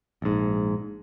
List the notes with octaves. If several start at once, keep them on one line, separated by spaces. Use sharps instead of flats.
A#1 G#2